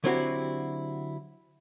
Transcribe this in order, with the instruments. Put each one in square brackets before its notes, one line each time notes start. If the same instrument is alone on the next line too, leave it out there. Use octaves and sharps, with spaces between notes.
[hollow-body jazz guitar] D3 F#3 C4 E4 F#4 G4